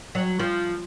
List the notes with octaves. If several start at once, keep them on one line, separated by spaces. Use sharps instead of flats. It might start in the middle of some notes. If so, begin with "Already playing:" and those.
F#3
F3